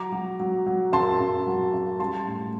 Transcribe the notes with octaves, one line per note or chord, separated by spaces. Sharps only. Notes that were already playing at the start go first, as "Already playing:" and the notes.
Already playing: F#3 A#5 D6
F#3
F#3
F#3
F#2 A5 C6
F#2
F#3
F#2
G3 A5 C6
A2